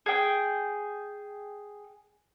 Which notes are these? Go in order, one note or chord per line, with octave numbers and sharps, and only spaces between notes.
G#4 G5